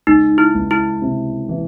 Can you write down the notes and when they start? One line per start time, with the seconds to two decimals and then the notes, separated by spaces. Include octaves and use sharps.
0.07 C#2 D#4
0.38 E4
0.54 C#2
0.71 E4
1.02 C3
1.49 E3